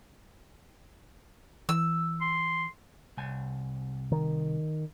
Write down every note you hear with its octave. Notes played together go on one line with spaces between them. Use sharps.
E3 E6
C6
C2 G#5
D#3